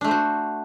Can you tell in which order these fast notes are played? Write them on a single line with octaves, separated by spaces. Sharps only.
D4 A3 C5 F#4